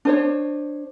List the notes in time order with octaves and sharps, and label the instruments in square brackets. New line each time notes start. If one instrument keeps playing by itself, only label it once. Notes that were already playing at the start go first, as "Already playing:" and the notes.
[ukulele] D4 C5 C#5